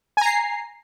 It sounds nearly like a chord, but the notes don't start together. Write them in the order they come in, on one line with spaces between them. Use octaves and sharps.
G#5 A#5 C7